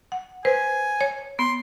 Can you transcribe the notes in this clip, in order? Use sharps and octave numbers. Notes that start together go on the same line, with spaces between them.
F#5
B4 C5 G#5
C#5
B3 C6